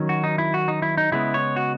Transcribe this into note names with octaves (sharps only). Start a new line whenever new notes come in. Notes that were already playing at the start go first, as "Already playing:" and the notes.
Already playing: D#3 F#3 C#4
F#4
D#4
E4
F#4
D#4
E4
D#4
C#3 G#3 B3 E4
C#5
F#4